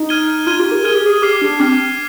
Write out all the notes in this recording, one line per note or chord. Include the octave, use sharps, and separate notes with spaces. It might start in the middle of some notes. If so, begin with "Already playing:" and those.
Already playing: D#4
F6 G#6 D#7 G7
F4 F6 G#6 D#7 G7
G4
A#4
G#4 F6 G#6 D#7 G7
G4
G#4
G4 D6 F6 C7
D4
C4 D6 F6